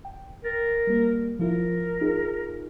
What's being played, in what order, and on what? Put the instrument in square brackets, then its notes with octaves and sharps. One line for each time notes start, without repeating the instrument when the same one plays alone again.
[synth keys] G5
[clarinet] A#4 [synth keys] A6
[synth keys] G3 A#3
[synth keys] F3 E4 F4 [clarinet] A#4
[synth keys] D#4 F4 G#4